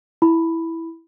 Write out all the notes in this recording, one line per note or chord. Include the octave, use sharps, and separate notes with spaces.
E4 B5